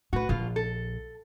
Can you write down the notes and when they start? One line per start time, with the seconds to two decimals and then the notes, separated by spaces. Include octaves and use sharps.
0.13 A2 F#4 B4
0.29 A#1 B2 F4
0.56 A4